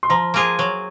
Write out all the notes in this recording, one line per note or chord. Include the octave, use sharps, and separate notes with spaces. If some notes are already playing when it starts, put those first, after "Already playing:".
C6
F3 A#5
A#3 F4 G#4
F#3